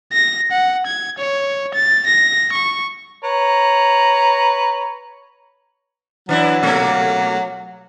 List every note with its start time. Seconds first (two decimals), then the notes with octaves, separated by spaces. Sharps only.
0.13 A#6
0.51 F#5
0.86 G#6
1.18 C#5
1.74 A6
2.06 A#6
2.52 C#6
3.24 B4 C#5 A#5
6.29 E3 F#3 D4 E4
6.63 B2 A3 A#3